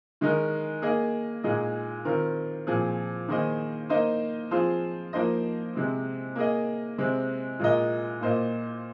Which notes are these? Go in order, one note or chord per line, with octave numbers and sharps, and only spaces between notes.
D#3 G#3 D#4 A#4
A#3 G#4 D#5
A#2 G#3 D#4 G#4 D#5
D#3 C4 F4 A#4
A#2 F3 C4 G#4
D#3 A#3 G#4 C5 D#5
A#3 D#4 C5 D#5
F3 C4 F4 G#4 C5
F3 A#3 D#4 C5 D#5
C3 G#3 C4
A#3 G#4 D#5
C3 G#3 C4
A#2 G#3 F4 A#4 D#5
A#2 A#3 F4 C5 D#5